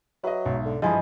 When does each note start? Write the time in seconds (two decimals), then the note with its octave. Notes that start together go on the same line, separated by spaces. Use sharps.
0.24 F#3 B4 D#5 E5
0.45 B1 G#2
0.65 D3
0.82 G2 E3 F3 G#3 D#5 G#5 B5